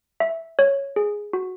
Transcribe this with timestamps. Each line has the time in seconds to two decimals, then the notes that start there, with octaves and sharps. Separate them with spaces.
0.20 E5
0.59 C#5
0.96 G#4
1.33 F#4